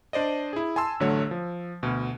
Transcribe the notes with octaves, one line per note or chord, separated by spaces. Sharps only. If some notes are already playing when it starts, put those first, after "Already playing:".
D4 C5 D5 D#5
E4 G#4
G#5 A5 C6 E6
A1 D3 F#3 A3 C#5
F3
D2 B2